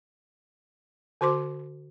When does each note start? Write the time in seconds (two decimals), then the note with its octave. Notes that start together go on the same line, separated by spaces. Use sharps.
1.21 D3 F#4 C5 C6 D6